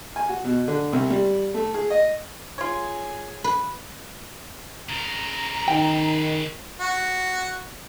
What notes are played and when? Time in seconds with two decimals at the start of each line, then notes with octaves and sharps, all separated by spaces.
0.16 G#5
0.29 F#4
0.44 B2
0.68 D3
0.93 C2
1.10 G3
1.54 A3
1.74 G#4
1.90 D#5
2.58 F4 G#4 C#5 G#5
3.44 B4
4.89 C#3 A#4 A#5
5.68 D#3 G5
6.80 F#4